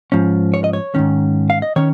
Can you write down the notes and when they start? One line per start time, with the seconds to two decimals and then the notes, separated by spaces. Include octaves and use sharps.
0.12 G#2 F3 C#4
0.54 C#5
0.64 D#5
0.73 C#5
0.95 G#2 D#3 C#4
1.50 F5
1.62 D#5
1.76 D#3 C#4 C#5